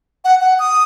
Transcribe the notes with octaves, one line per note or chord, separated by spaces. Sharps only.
F#5
F#5
D#6